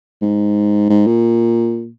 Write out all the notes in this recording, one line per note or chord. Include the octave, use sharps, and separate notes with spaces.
G#2
G#2
A#2